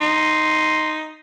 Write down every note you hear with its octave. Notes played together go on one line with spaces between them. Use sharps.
D#4 C6